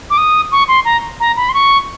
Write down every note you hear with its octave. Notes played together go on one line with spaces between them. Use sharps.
D6
D#6
C#6
C6
A#5
A#5
B5
C6
C#6